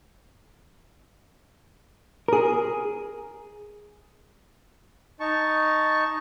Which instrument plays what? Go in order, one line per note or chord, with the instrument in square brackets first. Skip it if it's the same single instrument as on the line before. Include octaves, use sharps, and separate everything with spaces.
[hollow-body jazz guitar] G#4 A#4
[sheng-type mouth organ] D#4 A5 C#6